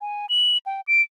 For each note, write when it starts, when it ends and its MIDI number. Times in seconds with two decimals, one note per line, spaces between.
0.01 0.26 80
0.29 0.57 102
0.66 0.81 79
0.87 1.01 98